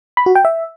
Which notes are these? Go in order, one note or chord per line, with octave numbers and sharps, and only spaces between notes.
B5
F#4
G5
E5